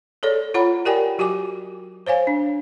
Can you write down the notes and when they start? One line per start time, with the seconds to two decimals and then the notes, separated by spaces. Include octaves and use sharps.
0.23 G#4 A4 C#5 D5
0.54 F4 C#5 F#5 A#5 B5
0.85 G4 A#4 D5 G5 G#5
1.18 F#3 F#4 G4 G#5 D6
2.07 C5 C#5 F5 G#5
2.27 D4